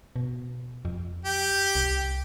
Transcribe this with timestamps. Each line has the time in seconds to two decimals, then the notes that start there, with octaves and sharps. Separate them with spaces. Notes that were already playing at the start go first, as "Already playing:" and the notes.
0.16 B2
0.85 F2
1.25 G4
1.75 C2